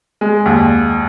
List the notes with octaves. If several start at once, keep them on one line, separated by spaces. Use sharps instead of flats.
G#3
D#2